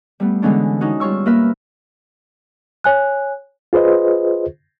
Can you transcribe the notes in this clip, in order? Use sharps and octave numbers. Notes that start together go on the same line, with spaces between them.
G3 A3 B3
D3 E3 G#3 B3 C#4 D4
C#4 D#4 F#4
G3 F4 C#5 C#6 E6
A#3 A#4 B4 E5
C#5 G#5 F#6
F4 G#4 B4 C5 D#5